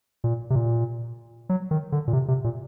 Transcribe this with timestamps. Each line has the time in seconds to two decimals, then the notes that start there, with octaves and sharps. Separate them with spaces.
0.24 A#2
0.50 C3
0.55 A#2
1.49 F#3
1.71 D#3
1.92 D3
2.08 A#2
2.13 C3
2.28 C3
2.44 A#2